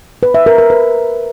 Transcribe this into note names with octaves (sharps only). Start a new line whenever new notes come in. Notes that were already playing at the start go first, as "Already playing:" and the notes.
B4
E5
A#4
A#4
B4